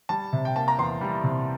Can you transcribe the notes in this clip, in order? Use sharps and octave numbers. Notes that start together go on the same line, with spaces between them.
G3 A5
C3
G5
A#3 A5
A#5
E2 C6
G3
C3